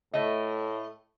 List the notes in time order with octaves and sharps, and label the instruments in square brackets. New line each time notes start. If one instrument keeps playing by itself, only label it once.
[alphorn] A2 [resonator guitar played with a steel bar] A3 D#5